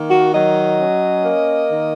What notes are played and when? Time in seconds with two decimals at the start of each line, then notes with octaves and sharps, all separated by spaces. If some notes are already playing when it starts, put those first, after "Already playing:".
Already playing: D#3 A#3
0.10 F#4
0.33 F#3 D#5
0.79 C#4
1.25 A#3
1.71 D#3